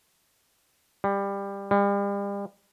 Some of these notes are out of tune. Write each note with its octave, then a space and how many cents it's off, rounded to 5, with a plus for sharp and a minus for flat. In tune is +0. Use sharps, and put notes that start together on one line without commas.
G3 +20
G3 +40